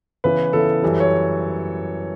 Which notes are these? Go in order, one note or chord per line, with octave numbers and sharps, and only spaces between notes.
C#3 E3 B3 E4 B4
C#3 E3 B3 E4 A4
F#2 E3 G3
C#5